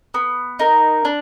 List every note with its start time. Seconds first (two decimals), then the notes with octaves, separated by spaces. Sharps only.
0.14 B3
0.59 D#4 A#4
1.05 D4